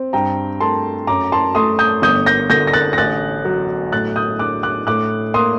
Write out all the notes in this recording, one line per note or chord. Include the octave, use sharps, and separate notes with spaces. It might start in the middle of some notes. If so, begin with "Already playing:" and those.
Already playing: C4
G2 G5 A#5
A3 A5 C6
F#2 A#5 D6
A5 C6
A3 C6 D#6
D#6 G6
G1 D#6 G6
G6 A#6
D3 G6 A#6
A#6
F#6 A6
A#6
A1 F#6 A6
F#3
A2 F#6 A6
D#6 G6
D4 D6 F#6
D6 F#6
A2 D6 F#6
A#3 C6 D#6